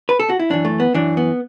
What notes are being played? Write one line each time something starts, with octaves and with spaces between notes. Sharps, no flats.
B4
A4
F#4
E4
F#2 E3 D4
A3
B3
F#2 E3 D4
B3